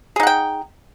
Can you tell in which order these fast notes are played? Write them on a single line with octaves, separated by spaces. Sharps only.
G#4 D#4 F#5 G5